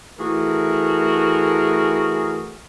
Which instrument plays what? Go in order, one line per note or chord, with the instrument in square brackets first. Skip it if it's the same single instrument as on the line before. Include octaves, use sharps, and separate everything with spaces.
[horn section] E3 A3 F#4 G#4 A#4